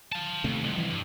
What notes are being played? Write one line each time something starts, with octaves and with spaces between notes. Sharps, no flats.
F5 A5
D#2 C3 A3
C2 F2
E3
G2